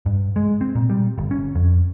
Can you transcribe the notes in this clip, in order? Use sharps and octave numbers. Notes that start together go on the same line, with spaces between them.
G2
G#3
C4
A#2
G3
G1
C#4
F2